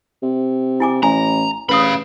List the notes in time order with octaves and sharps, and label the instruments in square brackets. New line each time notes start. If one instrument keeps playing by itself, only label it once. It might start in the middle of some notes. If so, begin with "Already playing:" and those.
[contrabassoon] C3
[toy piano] E4 G#5 D6
[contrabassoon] A1 [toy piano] G#5 [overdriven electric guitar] A#5
[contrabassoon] A1 [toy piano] B4 D#6 [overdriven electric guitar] F5 B5